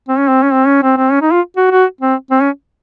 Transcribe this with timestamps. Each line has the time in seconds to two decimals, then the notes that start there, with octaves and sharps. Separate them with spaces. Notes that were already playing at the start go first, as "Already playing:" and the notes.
0.08 C4
0.18 C#4
0.28 C4
0.43 C#4
0.52 C4
0.67 C#4
0.83 C4
0.97 C4
1.11 C#4
1.22 D#4
1.32 F4
1.57 F#4
1.71 F#4
2.01 C4
2.31 C4
2.41 C#4